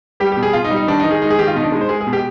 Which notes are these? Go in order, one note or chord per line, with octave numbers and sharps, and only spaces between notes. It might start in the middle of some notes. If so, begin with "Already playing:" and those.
G3 G4
G4
B2
G#4
B2 F4
D#4
G3
D#4
D#3 D4
D#3 D#4
G#4
G#3 D#4
G#4
D#3 G4
F4
B2 D#4
D4
G#3 D#4
C5
G#3 G#4
G#4
B2
G4